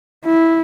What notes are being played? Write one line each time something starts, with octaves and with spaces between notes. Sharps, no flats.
E4